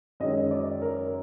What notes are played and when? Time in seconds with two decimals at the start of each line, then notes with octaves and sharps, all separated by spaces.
0.20 F#2 D#3 G#3 C#4 D#5
0.51 D5
0.82 A#4